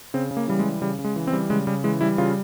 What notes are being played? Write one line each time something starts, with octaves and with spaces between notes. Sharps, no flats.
C#3 C4
C#3
A#3
E3 G3
G#3
G3
C#3 G3
C#3
G#3
E3
C4
G3
C#3 G#3
C#3 G3
E3 G#3
G3 E4
C#3 F4